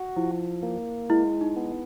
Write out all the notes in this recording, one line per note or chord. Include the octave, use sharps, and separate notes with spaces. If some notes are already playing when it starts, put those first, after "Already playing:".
Already playing: F#4
F3 E4
A#3
G#3 E4
D#4
B3